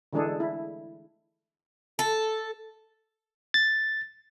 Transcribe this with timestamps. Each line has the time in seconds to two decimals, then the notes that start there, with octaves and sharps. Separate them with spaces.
0.13 D3 E3 G#3 D4 G#4 A4
0.40 E4
1.99 A4
3.54 A6